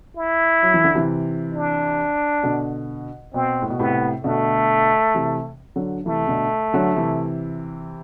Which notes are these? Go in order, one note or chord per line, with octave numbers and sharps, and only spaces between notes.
E4
F#3
E3
D3
C3 E3
D4
B2 D3
B2 C4
A2
B2
A2 C3 B3
B2 D3 A3
C3 E3
D3 F#3
C3 E3 A3
B2 D3
D3 F#3
C3 E3